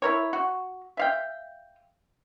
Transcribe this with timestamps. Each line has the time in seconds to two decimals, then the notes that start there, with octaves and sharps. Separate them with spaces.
0.02 E4 A#4 C#5
0.33 F#4
0.97 E5 F5 G5